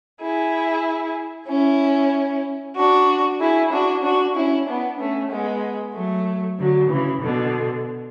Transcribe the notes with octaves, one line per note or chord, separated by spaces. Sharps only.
E4 G#4
C#4 E4
D4 F#4
E4 G#4
D4 F#4
D4 F#4
C#4 E4
B3 D4
A3 C#4
G#3 B3
F#3 A3
D3 F#3
C#3 E3
B2 D3